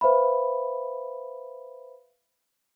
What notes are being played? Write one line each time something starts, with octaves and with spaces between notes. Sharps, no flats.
B4 C5 E5 F5 B5